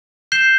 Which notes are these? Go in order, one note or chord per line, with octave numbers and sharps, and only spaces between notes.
G6 C7 E7 G7